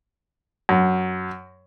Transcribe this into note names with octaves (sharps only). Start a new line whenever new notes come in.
F#2